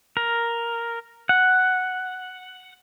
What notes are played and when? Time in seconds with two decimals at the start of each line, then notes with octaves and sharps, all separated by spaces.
0.17 A#4
1.29 F#5